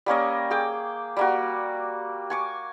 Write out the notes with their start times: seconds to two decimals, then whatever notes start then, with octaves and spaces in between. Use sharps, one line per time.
0.06 G3 A#3 C#4 D#5
0.50 G#4 G5 D6
1.17 G3 A#3 F#4
2.30 G#5 C#6 D6